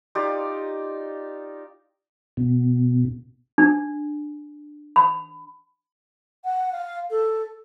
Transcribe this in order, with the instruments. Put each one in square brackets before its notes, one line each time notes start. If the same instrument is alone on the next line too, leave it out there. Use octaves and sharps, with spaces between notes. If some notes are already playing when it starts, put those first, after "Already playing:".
[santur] D#4 F4 G4 D5
[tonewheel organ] B2
[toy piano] D4
B5
[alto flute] F#5
F5
A4